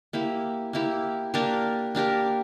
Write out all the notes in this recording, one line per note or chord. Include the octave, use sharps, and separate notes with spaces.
A#3 E4 G4
A#3 E4 G4
A#3 D4 G4 A#4
A#3 D4 G4 A#4